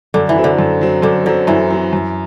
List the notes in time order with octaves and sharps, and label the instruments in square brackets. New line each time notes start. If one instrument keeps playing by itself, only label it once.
[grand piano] F#2 [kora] D3
[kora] E3
[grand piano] F#3 C4
[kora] D3
[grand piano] F#2
F#3 C4
[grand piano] F#2 [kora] D3
[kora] D3 [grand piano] F#3 C4
[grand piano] F#2 [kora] E3
[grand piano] F#3 C4
F#2